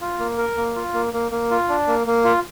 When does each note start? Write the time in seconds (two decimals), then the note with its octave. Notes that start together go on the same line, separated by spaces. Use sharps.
0.01 F4
0.20 A#3
0.38 A#4
0.57 A#3
0.76 F4
0.94 A#3
1.13 A#3
1.31 A#3
1.51 F4
1.69 D4
1.87 A#3
2.07 A#3
2.24 F4